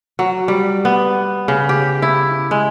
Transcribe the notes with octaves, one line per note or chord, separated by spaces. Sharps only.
F#3
G3
B3
C#3
G4
E4
G#3